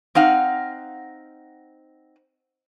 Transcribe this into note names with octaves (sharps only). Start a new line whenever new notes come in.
C4 D#4 F5 F#5